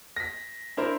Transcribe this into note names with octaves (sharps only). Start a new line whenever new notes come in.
A#6 B6
D4 E4 A#4 C5